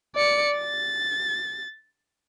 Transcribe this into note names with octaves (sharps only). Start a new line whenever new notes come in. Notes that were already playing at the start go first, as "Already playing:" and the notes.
D5 C#7
A6